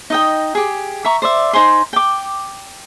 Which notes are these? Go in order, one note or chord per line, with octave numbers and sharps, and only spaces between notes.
D#4 D#5 G5
G4 G#4
E5 A#5 C#6
C5 D5 E5
D#4 C5 G#5 C6
G5 D6